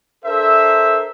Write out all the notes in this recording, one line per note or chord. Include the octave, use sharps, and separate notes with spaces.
D4 A4 A#4 C5 E5